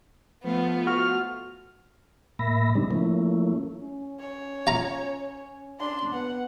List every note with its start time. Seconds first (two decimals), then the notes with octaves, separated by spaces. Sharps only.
0.44 F3 A3 B3 F4
0.87 F#4 F6
2.39 A2 A#3 E5 B5 A#6
2.75 C#3 G3 G#3 C4 D4 D#4
2.91 F3 A3 A#3 C#4 E4
3.80 C#4
4.20 C#5
4.67 F4 A#5
5.79 D4 C6
6.13 B3 F#5